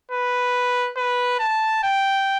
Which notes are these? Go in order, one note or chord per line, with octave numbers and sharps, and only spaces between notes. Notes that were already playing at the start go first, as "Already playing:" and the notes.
B4
B4
A5
G5